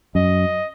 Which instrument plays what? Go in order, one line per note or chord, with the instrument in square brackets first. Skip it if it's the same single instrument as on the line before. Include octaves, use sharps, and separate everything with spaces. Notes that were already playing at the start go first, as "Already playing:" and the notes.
[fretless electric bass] F#2 [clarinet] D#5